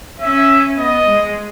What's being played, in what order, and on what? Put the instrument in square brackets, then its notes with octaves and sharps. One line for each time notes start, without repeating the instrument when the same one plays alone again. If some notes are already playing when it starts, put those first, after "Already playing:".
[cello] C#4 [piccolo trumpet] E5
[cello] B3 [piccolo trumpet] D#5
[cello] G#3